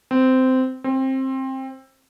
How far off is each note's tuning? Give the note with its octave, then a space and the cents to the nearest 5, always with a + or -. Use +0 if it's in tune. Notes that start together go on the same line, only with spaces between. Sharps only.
C4 -15
C4 +20